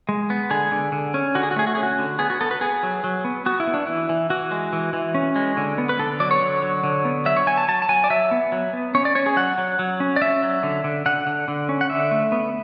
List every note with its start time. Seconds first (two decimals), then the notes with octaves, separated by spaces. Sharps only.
0.09 G#3
0.30 B3
0.51 D3 G#4
0.72 D3
0.92 D3
1.14 C#4
1.35 D3 F#4
1.43 G#4
1.51 F#4
1.56 A3 G#4
1.67 F#4
1.75 C#4 G#4
1.83 F#4
1.99 D3
2.19 B3 G#4
2.30 F#4
2.41 B3 A4
2.51 B4
2.61 B3 G#4
2.83 F#3
3.04 F#3
3.25 B3
3.46 B3 F#4
3.60 E4
3.67 B3
3.74 D4
3.87 E3 E4
4.09 E3
4.30 E3 F#4
4.51 G#3
4.73 E3
4.93 E3
5.14 C#4
5.36 G#3
5.57 D3
5.78 B3
5.89 B4
5.99 D3 A4
6.20 F#3 D5
6.31 C#5
6.41 D3
6.62 F#3
6.84 D3
7.05 B3
7.25 F#3 E5
7.37 C#5
7.46 F#3 G#5
7.58 A5
7.68 F#3 A5
7.82 A5
7.89 F#3 G#5
8.04 D5
8.10 F#3 E5
8.31 B3
8.52 F#3
8.73 B3
8.95 C#4 C#5
9.05 D5
9.15 C#4 C#5
9.26 G#4
9.36 F#3 F#5
9.58 F#3
9.79 F#3
10.00 C#4
10.16 D5
10.21 C#4 E5
10.42 F#3
10.63 D3
10.84 D3
11.06 D3 F#5
11.27 D3
11.48 D3
11.69 C#4
11.81 F#5
11.90 D3 E5
12.11 A3
12.32 B3